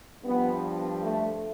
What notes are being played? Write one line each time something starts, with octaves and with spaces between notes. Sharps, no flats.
G2 F3 B3
A3